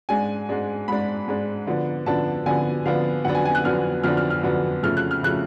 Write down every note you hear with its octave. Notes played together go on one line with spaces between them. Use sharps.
G#2 G#3 D4 G#5
G#2 G#3 D4
G#2 G#3 D4 B5
G#2 G#3 D4
D3 F3 B3 D4
D3 F3 B3 D4 A5
D3 F3 B3 D4 G#5
D3 F3 B3 D4 F5
F2 D3 F#3 B3 D4 F#5
G#5
G#5
F#6
F2 D3 F#3 B3 D4 F6
F2 D3 F#3 B3 D4 F6
F6
F6
F2 D3 F#3 B3 D4
F2 C#3 F3 A3 F6
F#6
F6
C#3 F3 A3 F#6